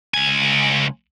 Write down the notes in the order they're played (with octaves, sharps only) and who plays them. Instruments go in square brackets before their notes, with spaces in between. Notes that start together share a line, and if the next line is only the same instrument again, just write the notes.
[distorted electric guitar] C#2 G#5